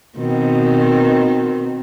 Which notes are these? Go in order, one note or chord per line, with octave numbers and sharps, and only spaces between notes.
B2 D#3 C4